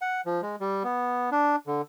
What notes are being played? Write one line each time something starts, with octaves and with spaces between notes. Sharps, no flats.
F#5
F3
G#3
G3
B3
D4
D3